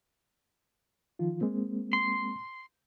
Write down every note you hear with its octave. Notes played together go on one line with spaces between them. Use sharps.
D#3 F3 F4
G#3 A#3 C4
C6